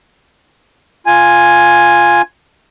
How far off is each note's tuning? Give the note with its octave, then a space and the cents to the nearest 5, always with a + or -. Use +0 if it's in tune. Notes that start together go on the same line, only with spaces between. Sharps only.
F4 +0 G#5 +0